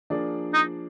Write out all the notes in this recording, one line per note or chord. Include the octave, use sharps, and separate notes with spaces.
F3 A#3 D4 G#4 D5
D#4